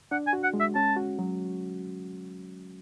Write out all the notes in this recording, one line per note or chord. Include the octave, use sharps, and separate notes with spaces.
D4 F#5
G#5
F#4
F#5
G#3
E5
C#4 A5
F#4
F#3